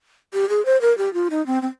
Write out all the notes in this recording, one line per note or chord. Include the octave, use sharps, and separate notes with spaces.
G4
G#4
C5
A#4
G4
F4
D#4
C4
C4